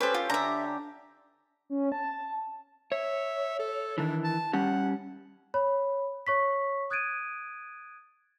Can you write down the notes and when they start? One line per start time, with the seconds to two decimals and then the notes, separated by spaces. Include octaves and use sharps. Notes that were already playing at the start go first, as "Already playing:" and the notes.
0.01 C#4 G4 A4 B4 C5
0.14 F4
0.30 D3 E5 A#5
1.70 C#4
1.92 A5
2.92 C#5 E5
3.59 A4
3.98 D#3 E3 D4
4.24 A5
4.53 G3 C#4 G4 F#5
5.54 C#5 B5
6.27 C#5 C#6 B6
6.90 D#6 F#6 G#6 A6 D7 D#7